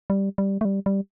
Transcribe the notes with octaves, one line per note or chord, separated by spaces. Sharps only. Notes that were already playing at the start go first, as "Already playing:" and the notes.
G3
G3
A3
G3
G3